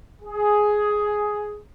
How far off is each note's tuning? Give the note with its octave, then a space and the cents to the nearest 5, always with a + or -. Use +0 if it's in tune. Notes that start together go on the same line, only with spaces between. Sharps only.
G#4 +5